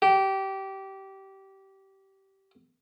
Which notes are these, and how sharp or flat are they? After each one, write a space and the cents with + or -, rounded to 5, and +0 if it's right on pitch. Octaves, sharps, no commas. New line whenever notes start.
G4 -20